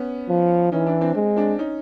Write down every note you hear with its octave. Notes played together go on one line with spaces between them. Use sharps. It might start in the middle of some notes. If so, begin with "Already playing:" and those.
Already playing: B3 C#4
F3
E3 C#4 D#4
D4 E4
C4 D4
G#3 C4
C4 D4
C#4 D#4